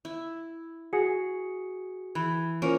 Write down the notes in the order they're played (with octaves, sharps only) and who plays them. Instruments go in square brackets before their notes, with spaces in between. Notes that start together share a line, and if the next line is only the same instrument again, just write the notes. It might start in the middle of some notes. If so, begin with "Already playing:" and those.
[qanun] E4
[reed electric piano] F#4 G#4 [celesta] C#7
[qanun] E3 [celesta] B5 G#6
[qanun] A#3 C#4 A#4 [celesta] F4 C5